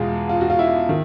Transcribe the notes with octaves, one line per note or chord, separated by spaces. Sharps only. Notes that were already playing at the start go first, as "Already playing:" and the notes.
Already playing: E2 B2 G#3 F4
F4
F#4
F4
E4
D#3